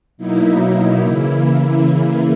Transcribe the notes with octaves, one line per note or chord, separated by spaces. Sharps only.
B2 F#3 A#3 D#4 E4
E4
C#3 E3 A#3